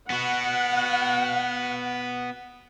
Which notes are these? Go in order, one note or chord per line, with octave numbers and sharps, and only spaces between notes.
B3 F#4 F#5